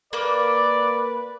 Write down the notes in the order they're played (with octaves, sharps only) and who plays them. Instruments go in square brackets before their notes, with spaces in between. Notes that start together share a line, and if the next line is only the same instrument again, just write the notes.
[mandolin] A#3 [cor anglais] B4 [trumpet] D5